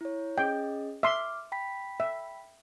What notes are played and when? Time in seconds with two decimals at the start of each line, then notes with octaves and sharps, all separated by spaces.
0.01 E4 C#5
0.38 C#4 G#4 D#5 G5
1.03 E5 C6 D6 F6
1.52 G5 B5 B6
2.00 E5